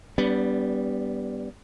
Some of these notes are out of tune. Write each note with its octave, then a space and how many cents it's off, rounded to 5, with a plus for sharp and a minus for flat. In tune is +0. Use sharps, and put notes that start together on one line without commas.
G3 +0 B3 +0 D4 -35